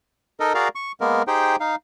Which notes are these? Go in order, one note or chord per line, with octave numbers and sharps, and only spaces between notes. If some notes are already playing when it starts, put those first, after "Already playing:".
D#4 A4 A#4 D#5
F#4 G#4 A#4 D5 F5 A#5
C#6
G#3 A#3 B3 A#4
D#4 G4 G#4 C5 G5
D#4 F5